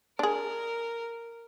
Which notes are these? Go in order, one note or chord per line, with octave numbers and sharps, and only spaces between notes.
D4 G#4 A#4